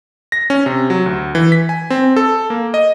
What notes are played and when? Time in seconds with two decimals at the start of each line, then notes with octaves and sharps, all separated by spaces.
0.32 A#6
0.50 C#4
0.66 C3
0.90 F#3
1.06 D2
1.35 E3
1.52 B6
1.69 G#5
1.90 C4
2.16 A4
2.50 A#3
2.74 D#5